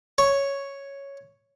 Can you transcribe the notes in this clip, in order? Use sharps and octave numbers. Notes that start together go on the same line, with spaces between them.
C#5